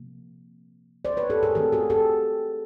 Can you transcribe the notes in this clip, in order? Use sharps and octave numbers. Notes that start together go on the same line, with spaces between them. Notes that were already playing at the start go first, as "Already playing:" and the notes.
Already playing: C3 F3 A#3
C5 D5
B4 C#5
G4 A4
G#4 A#4
E3 A3 C4 G4 A4
F#4 G#4
G4 A4